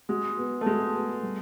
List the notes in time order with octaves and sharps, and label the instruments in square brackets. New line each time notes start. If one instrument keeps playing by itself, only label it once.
[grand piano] G#3 [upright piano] F#4
[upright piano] B3
[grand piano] A3
[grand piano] G#3 [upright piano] F#4
[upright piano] B3
G3